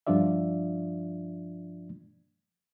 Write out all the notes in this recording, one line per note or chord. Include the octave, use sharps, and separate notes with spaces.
G2 F3 D4 F4 D5 E5